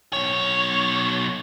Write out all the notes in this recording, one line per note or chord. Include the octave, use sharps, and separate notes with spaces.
B1 C#5